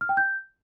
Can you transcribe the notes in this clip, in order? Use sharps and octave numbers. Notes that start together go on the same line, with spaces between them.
F6
G5
G6